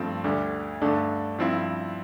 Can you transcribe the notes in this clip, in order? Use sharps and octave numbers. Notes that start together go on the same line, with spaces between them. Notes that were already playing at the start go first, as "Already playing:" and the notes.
Already playing: G2 F3 A3 C4
D2 D3 G3
G2 D3 A3 D4
G2 F3 C4 E4